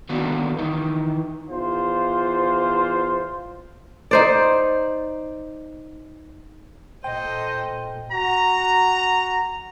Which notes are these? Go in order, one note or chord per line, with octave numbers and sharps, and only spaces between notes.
D3 D#3 G3 A#3 B3 F#4
D#3 E3 D#4
E2 F4 C5
D#4 C5 D5
A#2 A4 C5 D#5 G5
F#4 A#5